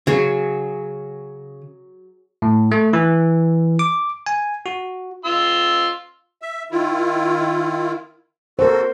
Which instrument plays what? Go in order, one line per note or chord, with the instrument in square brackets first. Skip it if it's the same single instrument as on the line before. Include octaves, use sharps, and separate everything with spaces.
[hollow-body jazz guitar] C#3 [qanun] F#3 G#4
[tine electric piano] A2
A3
E3
D6
G#5
F#4
[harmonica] F4 C6 E6
[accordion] E5
D#3 E4 F4
[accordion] F#4 A4 [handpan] A#4 C5